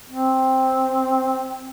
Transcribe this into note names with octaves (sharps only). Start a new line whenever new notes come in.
C4